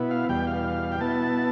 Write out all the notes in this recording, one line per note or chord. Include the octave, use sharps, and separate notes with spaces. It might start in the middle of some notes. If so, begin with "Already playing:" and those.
Already playing: B2 B3 E4
F5
E2 B2 G3 G5
F5
G5
B2 B3 E4 A5